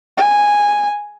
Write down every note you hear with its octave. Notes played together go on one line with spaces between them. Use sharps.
G#5